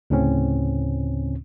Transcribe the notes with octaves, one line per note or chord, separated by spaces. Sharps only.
D2 A2 C#3 C4 C#4